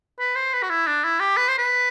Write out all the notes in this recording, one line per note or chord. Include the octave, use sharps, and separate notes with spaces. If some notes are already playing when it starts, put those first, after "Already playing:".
B4
C5
B4
F#4
E4
D4
E4
G4
B4
C5
B4